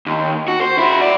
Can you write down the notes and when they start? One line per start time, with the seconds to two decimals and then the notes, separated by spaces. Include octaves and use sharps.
0.06 D#2
0.48 F#4
0.61 C5
0.78 E4 F#4
1.01 C2 D5